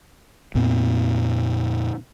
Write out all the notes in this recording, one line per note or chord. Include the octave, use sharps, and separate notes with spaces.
F2 A#2 B3 C4